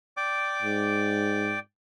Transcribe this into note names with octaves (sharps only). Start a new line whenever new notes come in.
D5 G5 D6
G#2